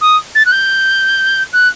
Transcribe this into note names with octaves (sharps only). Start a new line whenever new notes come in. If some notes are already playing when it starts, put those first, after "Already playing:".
D#6
A6
F#6
G6
F#6